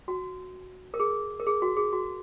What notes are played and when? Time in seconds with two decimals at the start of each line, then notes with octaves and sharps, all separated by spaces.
0.08 F#4
0.94 A#4
1.00 G#4
1.40 A#4
1.47 G#4
1.62 F#4
1.77 G#4
1.93 F#4